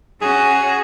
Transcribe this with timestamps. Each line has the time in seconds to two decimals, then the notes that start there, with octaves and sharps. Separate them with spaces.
0.21 C#4 F#4 G#4